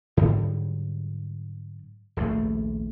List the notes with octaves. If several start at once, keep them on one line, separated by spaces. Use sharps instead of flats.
G#2 D3 F#3 G3
D#1 A#1 G#2 A3